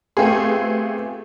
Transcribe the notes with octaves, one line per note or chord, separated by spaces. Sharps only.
A3 B3 C4 F4 G4 G#4